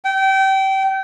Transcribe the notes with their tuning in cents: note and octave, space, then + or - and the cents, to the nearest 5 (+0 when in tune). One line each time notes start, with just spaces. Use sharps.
G5 -25